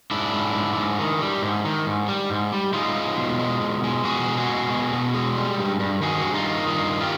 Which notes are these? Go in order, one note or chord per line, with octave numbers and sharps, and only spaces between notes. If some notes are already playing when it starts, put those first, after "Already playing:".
G#2 D4 E4
G#2
G#2
G#2
D#3
G3
G#2
D#3
G#2
G3
G#2
G3
G#3 D#4 F4
G#3
B2
G#3
B2
G#3
B2 F#4 G#4
G#3
F#4 G#4
B2
B2
B2
G#3
G3
G2
G2
D#3 F#4 G#4
G2
D#4 F4
D#3
G2 D#4 F4
D#3
F4 G4